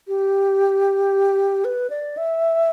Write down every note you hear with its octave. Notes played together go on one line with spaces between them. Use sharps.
G4
B4
D5
E5